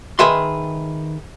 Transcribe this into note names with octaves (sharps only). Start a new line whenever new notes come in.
D#3 G#4 B4 E5 C6